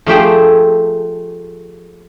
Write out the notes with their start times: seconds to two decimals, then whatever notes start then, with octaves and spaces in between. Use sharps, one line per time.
0.06 F3 A3 G4 G#4